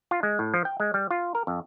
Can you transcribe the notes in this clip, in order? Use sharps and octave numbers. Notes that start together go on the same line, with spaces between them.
F4
G#3
A2
F3
G5
G#3
G3
F4
A#4
F2